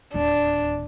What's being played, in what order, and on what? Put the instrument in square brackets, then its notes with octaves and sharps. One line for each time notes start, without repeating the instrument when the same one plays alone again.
[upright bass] D1 D#2 [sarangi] D4